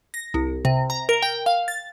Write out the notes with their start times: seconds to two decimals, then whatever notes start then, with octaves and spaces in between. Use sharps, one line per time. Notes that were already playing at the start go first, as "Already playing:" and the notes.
0.14 A#6
0.34 C2
0.65 C3
0.90 A#5
1.09 A#4
1.22 G5
1.46 F5
1.68 A6